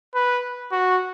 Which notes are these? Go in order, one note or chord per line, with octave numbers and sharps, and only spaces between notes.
B4
F#4